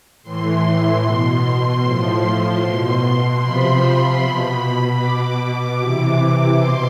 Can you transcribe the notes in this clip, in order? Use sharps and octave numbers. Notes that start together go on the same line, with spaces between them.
A2 E3 C6
B2
A2 F3
B2
C3 F3 B5
B2
B2 D6
C3 E3
B2 C6